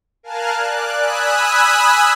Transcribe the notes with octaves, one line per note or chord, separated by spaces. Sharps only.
A#4 F5 G#5 A5 F6 F#6
D5 F#6
G#5 B5 D#6 E6 F#6